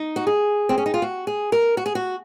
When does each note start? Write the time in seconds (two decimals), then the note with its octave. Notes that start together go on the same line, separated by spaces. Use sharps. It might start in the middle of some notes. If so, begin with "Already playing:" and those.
Already playing: D#4
0.16 F#4
0.27 G#4
0.69 C4
0.78 C#4
0.86 D#4
0.94 F4
1.02 F#4
1.27 G#4
1.52 A#4
1.77 F#4
1.86 G#4
1.95 F#4